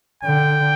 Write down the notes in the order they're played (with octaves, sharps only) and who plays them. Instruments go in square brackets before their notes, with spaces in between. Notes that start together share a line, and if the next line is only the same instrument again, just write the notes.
[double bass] D3 [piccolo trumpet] G5